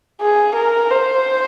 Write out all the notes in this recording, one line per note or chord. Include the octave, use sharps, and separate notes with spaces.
G#4
A#4
C5